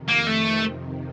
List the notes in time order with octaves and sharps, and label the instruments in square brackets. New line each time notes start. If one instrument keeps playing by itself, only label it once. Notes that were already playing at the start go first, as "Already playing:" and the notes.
Already playing: [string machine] F2 C3 D#3
[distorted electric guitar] A#3
A3